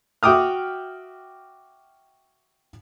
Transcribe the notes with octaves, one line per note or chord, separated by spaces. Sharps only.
F#4 E5 G5 D6 D#6 F6